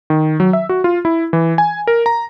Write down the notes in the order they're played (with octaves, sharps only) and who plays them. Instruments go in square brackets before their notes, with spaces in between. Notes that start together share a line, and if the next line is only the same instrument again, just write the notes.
[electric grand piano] D#3
F#3
E5
F#4
F4
E4
E3
G#5
A#4
A#5